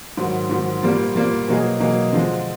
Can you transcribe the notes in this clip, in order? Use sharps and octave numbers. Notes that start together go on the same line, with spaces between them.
G#2 D#3 F#3
G#2 D#3 F#3
A#2 G3 A#3
A#2 G3 A#3
B2 F#3 A#3 D#4 G#4
B2 F#3 A#3 D#4 G#4
D3 F3 G#3